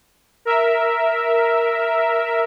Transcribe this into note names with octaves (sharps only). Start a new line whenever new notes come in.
A#4 E5